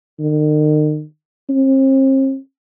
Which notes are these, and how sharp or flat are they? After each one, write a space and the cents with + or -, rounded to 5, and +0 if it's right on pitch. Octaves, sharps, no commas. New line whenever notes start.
D#3 -40
C4 +40